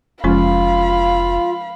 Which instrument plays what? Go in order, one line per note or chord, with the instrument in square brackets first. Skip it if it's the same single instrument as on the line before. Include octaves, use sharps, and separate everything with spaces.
[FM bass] F1 [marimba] F3 G#3 C#4 [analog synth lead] F4 [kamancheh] F5 B5